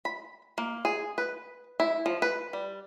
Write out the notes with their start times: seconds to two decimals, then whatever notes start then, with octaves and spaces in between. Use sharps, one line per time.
0.05 B5
0.58 A#3
0.85 G#4
1.18 B4
1.80 E4
2.06 F3
2.22 B4
2.53 G3